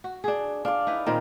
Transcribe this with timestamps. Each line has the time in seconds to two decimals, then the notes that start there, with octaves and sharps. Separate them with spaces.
0.04 F#4
0.24 D4 G#4
0.65 D4 D5 F5
0.87 D#4 E4 B4
1.06 A#2 D#3 C4 A#4